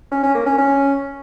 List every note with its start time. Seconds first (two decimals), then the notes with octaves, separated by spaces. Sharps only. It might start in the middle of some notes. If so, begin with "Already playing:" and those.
0.12 C#4
0.23 C#4
0.35 A#3
0.46 C#4
0.58 C#4